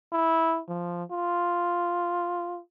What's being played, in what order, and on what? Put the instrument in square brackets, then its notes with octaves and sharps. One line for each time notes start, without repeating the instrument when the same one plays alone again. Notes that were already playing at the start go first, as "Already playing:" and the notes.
[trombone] E4
F3
F4